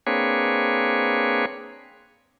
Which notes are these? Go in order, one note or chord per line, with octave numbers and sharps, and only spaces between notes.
A#3 C4 D4 G#4 B4 C#5